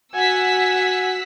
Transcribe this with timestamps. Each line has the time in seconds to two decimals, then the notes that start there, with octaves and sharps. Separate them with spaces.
0.14 F#4 F#5 G#5 E6 B6